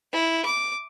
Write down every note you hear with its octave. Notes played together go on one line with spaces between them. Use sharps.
E4
D6